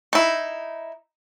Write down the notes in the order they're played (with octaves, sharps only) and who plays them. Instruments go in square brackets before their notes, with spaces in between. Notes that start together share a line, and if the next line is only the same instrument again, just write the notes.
[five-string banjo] D#4 E4